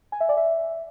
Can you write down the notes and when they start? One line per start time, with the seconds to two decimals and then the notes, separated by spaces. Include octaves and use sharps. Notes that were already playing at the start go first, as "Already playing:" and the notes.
0.12 G#5
0.20 E5
0.29 D5
0.37 E5